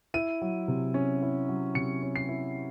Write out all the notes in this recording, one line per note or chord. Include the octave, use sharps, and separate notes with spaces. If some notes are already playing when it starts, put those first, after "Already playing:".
E4 D#7
F#3
C3
C#4
E4
F#3
C3 C#7
C#4
C7
E4